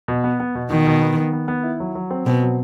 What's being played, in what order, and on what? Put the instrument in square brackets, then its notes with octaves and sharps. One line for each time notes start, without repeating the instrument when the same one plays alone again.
[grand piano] B2
B3
B3
B2
[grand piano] B2 [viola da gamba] D#3
[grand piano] B2
B3
B3
B3
B3
E4
F#3
F#3
C4
[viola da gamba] B2 [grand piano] C4
[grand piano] F#3